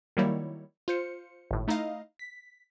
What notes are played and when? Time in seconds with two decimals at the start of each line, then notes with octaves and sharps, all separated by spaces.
0.17 D#3 F#3 G3 A#3 E4 C#5
0.88 F4 C5 C#7
1.51 G#1 A2
1.68 A3 D#4 E4 D#5 F5
2.19 B6